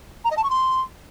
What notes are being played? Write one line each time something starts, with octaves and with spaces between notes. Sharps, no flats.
A#5
D#5
A5
C#6
C6